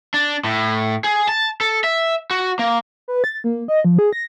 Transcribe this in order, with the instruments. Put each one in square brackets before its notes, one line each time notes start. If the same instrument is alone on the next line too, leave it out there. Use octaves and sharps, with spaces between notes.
[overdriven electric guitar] D4
A2
G#4
A5
A4
E5
F#4
A#3
[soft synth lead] B4
A6
A#3
D#5
F3
G#4
A#6